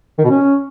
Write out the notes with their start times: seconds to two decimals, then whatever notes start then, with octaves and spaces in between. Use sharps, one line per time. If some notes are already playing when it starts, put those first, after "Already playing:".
0.18 D#3
0.24 B2
0.30 C#4